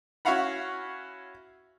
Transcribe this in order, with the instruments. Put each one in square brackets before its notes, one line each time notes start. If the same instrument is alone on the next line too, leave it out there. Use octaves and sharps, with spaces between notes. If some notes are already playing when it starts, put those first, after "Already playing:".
[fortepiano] C#4 E4 F#4 F5 F#5 B5